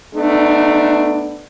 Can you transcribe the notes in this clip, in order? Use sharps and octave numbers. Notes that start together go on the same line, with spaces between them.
A3 B3 D4 D#4